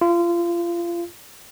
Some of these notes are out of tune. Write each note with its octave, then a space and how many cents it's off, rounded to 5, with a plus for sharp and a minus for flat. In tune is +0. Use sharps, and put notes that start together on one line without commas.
F4 -30